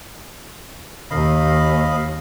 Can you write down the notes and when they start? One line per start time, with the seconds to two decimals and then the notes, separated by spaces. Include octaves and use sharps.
1.11 D#2 D#5 F5 B5